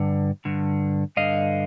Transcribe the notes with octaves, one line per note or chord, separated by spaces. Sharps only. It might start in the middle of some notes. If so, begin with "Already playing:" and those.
Already playing: G2 D3
G2 D3
G2 D3 D#5 F5